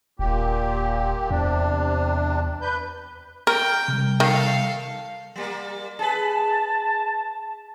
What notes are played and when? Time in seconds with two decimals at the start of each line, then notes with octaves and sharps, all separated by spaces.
0.19 D#1 A#2 G4
1.31 E2 C3 D4
2.61 B4 G6
3.47 A#4 G5
3.88 C3 G3
4.20 D#3 A4 F5
5.36 G3 A#3
5.99 G#4 B4 A5